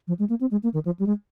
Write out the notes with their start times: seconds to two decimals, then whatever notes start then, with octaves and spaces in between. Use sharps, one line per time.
0.08 F3
0.19 G#3
0.29 A#3
0.41 C4
0.51 G#3
0.63 A#3
0.74 D#3
0.85 F3
0.99 G3
1.06 G#3